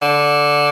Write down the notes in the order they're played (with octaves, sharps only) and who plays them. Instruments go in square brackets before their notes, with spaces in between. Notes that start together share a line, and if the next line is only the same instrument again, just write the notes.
[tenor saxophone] D3